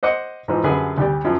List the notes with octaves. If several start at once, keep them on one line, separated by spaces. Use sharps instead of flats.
C5 D#5 F#5 D6
G#2 E3 F3
F#2 D3 G3 G#4 B4 G#5
D2 G3 G4 D5
F#2 F3